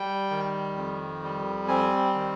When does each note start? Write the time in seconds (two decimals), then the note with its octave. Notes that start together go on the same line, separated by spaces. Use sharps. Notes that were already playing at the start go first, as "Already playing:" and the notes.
Already playing: G3 G5
0.30 D#3
0.76 F2
1.23 G3
1.68 C4 G#5
2.14 D#3